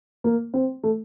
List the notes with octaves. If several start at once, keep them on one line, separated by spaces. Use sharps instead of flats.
A#3
C4
A3